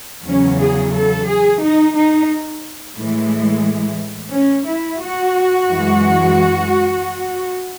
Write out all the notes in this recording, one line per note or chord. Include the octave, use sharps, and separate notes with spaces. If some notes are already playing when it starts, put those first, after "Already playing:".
E2 C#3 F#3 C#4
G#4
A4
G#4
D#4
D#4
A2 E3 G#3
C#4
E4
F#4
F#2 E3 G#3